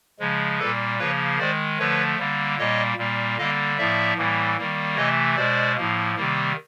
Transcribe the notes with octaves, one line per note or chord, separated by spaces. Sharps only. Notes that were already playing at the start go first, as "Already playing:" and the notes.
C#3 F3 G#3
A#2 G3 A#3 A4 B4
C#3 F3 A#3 B4 C#5
D#3 G#3 C5 D5
D3 F3 A3 B4 C#5
D3 G3 A#3
A#2 G3 A#3 C#5 D#5
A#2 G3 A#3
D3 G3 A#3 D#5 F5
A2 F3 A#3 D5 E5
A2 E3 G3 A#3
D#3 G3 A#3
C3 E3 A3 C#5 D#5
B2 G#3 C5 D5
A2 F3 A#3
C3 D#3 G3 A#3